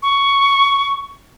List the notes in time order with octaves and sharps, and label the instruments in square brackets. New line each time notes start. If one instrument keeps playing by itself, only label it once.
[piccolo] C#6